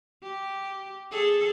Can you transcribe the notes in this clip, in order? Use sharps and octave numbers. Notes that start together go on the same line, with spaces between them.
G4
G#4 A4